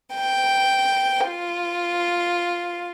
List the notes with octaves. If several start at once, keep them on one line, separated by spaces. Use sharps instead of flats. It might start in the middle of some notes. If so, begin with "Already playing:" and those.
G5
F4